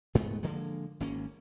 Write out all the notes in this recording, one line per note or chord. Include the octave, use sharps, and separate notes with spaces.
G#2 G#3 A3 B3
D3 F3 G#3 A#3
G#1 A#3 C#4